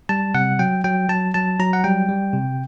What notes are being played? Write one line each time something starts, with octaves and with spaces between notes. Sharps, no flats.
G3 A5
C3 F#5
F#3 G5
F#3 G5
F#3 A5
F#3 A5
F#3 A#5
F#5
G3 G5
G3
C3